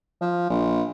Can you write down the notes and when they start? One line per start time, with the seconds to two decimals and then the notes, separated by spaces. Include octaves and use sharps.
0.21 F3
0.49 A#1